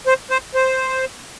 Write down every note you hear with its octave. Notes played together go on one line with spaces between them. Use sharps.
C5
C5
C5